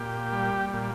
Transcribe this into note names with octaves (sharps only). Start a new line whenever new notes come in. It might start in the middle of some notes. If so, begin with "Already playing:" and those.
Already playing: A#2 G4
G3
A#2